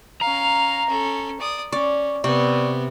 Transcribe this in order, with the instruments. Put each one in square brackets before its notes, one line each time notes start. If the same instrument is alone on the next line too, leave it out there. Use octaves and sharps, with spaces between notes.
[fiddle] C#4 F5 [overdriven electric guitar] A#5
[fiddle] C#4 A4
D5 D#6
[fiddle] C#4 [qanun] D5 [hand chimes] C#6
[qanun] C3 [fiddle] B3 [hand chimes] D5 C#6